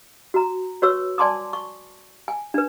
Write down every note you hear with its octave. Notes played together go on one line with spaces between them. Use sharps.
F#4 A#5
F#4 B4 C#5 C#6 E6
D5 G#5 A5 C6 D6 D#6
C#6
G#5
D4 B4